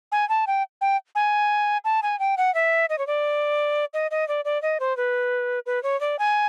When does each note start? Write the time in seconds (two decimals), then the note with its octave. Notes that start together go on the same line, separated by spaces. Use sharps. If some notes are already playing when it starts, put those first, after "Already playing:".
0.12 G#5
0.29 A5
0.47 G5
0.81 G5
1.15 G#5
1.85 A5
2.03 G#5
2.19 G5
2.37 F#5
2.54 E5
2.89 D#5
2.98 C#5
3.07 D5
3.94 D#5
4.11 D#5
4.28 D5
4.45 D5
4.62 D#5
4.80 C5
4.97 B4
5.66 B4
5.83 C#5
6.01 D5
6.19 G#5